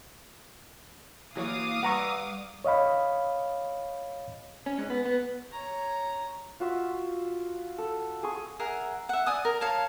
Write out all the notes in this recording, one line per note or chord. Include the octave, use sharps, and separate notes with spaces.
E3 F#3 A#3 C#5 F5 D6 D#6
G3 B4 F#5 A#5 C#6 E6
C#5 D#5 F5 B5
C#4
G#2
B3
B3
C#5 A#5
F4 F#4 E5
A4
G#4 C#6
G#4 A#4 E5 F#5
E5 F#5
D5 G#5 D#6
A#4
C#5 F5 A5